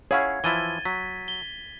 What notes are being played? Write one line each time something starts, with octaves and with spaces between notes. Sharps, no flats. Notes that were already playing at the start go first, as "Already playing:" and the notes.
C#4 E4 G#4 C#5 F5 F#5 G#6
E3 F3 E4 A6 D#7 G7
F#3 B6
G7